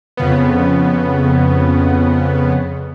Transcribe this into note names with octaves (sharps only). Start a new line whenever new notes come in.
F2 C#3 B3